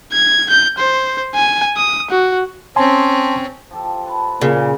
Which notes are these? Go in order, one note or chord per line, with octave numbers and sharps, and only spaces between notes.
G#6
G6
C5
G#5
D#6
F#4
C4 C#4 G#5 A5 C6
F3 G4 A4
B4 A5
A#2 C#3